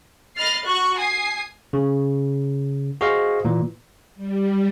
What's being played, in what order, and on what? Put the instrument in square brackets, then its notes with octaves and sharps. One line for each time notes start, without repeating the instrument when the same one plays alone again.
[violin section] D#5 B5 F6 A6 C7
F#4 C#6 F#6
G#5 D#6 C7
[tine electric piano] C#3
F#4 G#4 C5 D#5 F5
A#2 E3
[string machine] G3